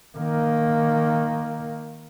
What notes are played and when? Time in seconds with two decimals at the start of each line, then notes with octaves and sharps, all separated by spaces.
0.18 D#3 A#3